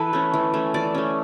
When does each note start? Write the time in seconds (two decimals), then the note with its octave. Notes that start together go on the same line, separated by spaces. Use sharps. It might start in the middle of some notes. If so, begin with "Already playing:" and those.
Already playing: E3 A4 B4
0.13 A3 C#4
0.34 E3
0.54 A3 C#4
0.74 E3 D5
0.95 A3 C#4